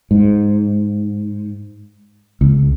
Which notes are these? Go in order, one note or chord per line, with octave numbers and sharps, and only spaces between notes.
G#2
C#2